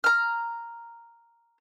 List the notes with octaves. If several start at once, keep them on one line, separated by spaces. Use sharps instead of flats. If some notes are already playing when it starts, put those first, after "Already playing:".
A#5 F6